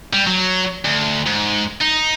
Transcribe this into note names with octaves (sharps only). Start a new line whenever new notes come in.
G3
F#3
D2
G#2
D#4